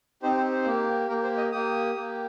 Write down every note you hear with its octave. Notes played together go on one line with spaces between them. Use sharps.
C4 D#4 G4 C5
C5
C5
A#3 G4
A#3 G4 A#4
C5
D#5
A#3 G4 D#6
A#3 G4